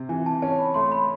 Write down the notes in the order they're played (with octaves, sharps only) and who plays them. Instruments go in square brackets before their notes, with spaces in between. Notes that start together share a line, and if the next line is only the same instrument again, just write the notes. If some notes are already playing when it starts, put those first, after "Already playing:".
Already playing: [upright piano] C3
[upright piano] E3 [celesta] G#5
[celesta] A5
[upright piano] C#4 [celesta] A5
[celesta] B5
[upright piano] A3 [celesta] C6
[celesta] B5